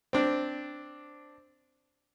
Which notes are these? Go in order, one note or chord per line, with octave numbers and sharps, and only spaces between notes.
C4 D4